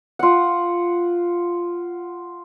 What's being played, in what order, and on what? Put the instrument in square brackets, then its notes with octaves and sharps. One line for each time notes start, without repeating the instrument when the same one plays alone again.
[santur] F4 F#5